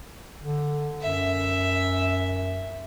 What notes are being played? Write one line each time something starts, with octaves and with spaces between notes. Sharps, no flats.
D3
F#2 E5